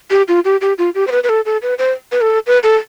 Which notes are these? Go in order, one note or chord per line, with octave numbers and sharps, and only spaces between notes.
G4
F4
G4
G4
F4
G4
C5
B4
B4
A4
A4
B4
C5
B4
A4
B4
A4